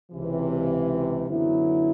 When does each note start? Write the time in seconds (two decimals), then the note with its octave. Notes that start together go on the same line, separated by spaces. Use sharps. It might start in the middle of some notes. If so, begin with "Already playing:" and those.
0.11 C#2 C3 E3
1.27 F#2 D3 F#3 B3 E4